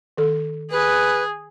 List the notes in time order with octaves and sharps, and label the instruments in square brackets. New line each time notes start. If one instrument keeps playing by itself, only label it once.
[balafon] D#3 A4
[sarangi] G#4 [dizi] B4